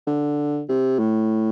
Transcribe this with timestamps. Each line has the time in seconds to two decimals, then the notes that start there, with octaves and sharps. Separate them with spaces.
0.07 D3
0.68 C3
0.99 A2